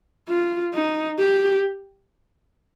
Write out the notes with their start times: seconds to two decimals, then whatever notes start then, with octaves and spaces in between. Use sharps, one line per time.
0.28 F4
0.74 D#4
1.19 G4